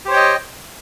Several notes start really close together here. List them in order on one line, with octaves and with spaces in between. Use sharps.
G4 C5 C#5 G5 D#5